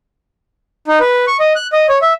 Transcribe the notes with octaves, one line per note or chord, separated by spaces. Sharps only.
D#4
B4
C#6
D#5
F#6
D#5
C#5
E5